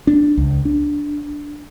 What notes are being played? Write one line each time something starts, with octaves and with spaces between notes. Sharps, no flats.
D4
C#2
D4